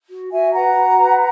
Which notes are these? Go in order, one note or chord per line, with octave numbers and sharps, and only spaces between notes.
F#4
F#4 E5 G#5
B4 F#5 A#5
F#4
B4